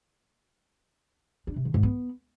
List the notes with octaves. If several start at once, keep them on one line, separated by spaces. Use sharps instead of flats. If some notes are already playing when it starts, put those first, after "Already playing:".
D4
C3
D#3
G#2
B3